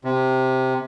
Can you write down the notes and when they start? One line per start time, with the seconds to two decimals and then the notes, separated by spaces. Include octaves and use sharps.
0.05 C3